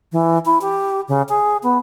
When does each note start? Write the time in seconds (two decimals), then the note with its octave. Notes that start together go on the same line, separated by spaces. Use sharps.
0.12 E3
0.45 E4
0.61 G4
1.08 C#3
1.29 G#4
1.63 B3